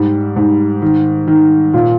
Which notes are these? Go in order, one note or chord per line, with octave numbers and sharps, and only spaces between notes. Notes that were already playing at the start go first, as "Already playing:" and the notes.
Already playing: G#2 G3
G#2
D#3
D#3
A#2